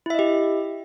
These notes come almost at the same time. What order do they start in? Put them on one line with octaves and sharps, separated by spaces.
E4 E5 D#5 G4